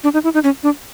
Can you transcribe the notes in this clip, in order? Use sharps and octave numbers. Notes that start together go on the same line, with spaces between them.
D4
D#4
E4
D#4
C#4
D4